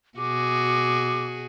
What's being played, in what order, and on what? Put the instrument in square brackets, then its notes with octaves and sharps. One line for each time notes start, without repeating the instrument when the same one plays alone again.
[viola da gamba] B2 F#4 G#4 [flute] D6